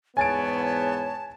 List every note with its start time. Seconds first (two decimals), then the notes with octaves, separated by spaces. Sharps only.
0.17 E2 G#2 B3 C#5 G#5 A5 A6 D7